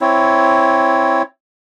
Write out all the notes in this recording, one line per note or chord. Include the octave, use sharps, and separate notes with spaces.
C4 E4 C#5